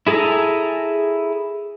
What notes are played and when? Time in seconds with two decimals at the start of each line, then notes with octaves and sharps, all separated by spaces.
0.07 E4 G#4 A4 G#5 A#5